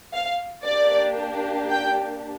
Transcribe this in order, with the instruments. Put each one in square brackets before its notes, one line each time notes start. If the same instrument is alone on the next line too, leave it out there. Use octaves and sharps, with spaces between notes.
[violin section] F5
A#3 D4 G4 D5
G5